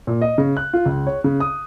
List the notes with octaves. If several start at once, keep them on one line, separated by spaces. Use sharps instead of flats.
A#2
D#5
C#3
F#6
F4
C#2
C#5
C#3
D#6